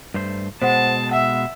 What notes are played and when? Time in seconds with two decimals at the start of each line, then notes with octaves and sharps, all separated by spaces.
0.14 G2 A3 C5
0.62 B2 G#3 C5 F#5 A5
1.11 E5 F#5